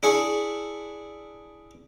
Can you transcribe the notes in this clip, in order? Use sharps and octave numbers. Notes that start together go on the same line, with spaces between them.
D4 E4 G#4 C#6